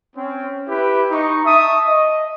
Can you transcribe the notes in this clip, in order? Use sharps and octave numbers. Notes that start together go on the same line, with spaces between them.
C4 C#4
E4 G4 B4
D#4 C#6
E5 A5 C#6 D#6
D#5